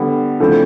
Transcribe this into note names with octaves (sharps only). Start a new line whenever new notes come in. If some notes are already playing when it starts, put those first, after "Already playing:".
Already playing: D3 G3 B3
D3 F3 A3 C4 E4